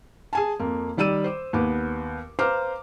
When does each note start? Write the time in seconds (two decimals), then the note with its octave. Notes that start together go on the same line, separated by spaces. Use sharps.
0.33 G#4 G#5 A5
0.59 F2 A#3
0.97 D#3 G3 D5 E6 D#7
1.24 C5 D6
1.53 D#2 B3 D6
2.39 B4 C5 F5 A#5 D6 F6